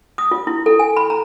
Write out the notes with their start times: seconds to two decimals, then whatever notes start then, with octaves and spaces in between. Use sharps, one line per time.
0.18 D#6
0.31 F4
0.47 E4
0.66 A4
0.79 G#5
0.97 B5
1.10 A#5